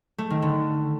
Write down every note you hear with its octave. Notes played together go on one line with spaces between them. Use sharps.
A3
D#3
D3